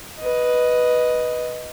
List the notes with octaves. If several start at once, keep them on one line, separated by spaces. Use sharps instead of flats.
B4 D#5